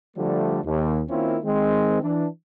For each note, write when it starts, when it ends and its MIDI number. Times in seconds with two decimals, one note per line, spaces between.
0.17 0.59 50
0.17 0.59 53
0.17 0.59 55
0.17 0.59 57
0.65 1.02 39
1.09 1.37 51
1.09 1.37 58
1.09 1.37 60
1.09 1.37 61
1.09 1.37 64
1.09 1.37 65
1.44 2.00 51
1.44 2.00 56
1.44 2.00 60
2.03 2.27 52
2.03 2.27 62